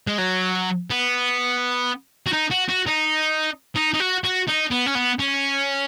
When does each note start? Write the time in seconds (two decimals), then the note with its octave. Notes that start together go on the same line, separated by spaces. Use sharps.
0.07 G#3
0.18 F#3
0.90 B3
2.26 F#4
2.33 D#4
2.51 F#4
2.69 F#4
2.87 D#4
3.76 D#4
3.94 D#4
4.00 F#4
4.24 F#4
4.48 D#4
4.71 B3
4.86 C#4
4.95 B3
5.19 C#4